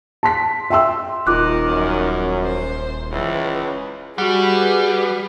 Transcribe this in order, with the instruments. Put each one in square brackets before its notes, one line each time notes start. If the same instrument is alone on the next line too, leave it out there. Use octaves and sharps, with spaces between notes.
[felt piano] A5 C6 B6
E5 G5 C6 E6
[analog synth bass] D#1 [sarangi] D#3 [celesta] F4 D6 F#6
[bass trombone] F#2
[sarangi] C5
[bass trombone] C#2 [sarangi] E3
[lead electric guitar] G3 [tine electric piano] F#4 F#5 [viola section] G#4 B4